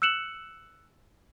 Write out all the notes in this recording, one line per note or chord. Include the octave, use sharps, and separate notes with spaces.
E6 F#6 C#7 E7 F#7